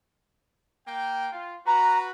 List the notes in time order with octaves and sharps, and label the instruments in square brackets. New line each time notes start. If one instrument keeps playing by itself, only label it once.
[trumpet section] A#3 G5
F4
[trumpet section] F#4 B4 [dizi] A#5